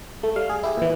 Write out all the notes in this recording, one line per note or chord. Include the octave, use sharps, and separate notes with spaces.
A3
G3 F5
G#4
E4 G4 G#4
A#2 E3